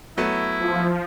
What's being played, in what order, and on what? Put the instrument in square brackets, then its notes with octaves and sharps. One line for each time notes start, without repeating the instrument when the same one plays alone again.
[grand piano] F#3 A3 B3 [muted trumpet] E4
[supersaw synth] F3